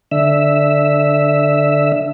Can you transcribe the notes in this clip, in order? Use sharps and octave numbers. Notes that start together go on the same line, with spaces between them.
D3 E5